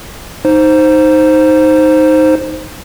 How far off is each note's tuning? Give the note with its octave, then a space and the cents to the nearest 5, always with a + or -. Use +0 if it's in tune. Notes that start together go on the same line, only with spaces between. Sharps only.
D#4 +0 C5 +0